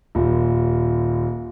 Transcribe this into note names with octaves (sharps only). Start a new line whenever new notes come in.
D#1 D#2